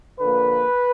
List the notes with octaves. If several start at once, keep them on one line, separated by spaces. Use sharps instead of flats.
D3 F3 A#3 B4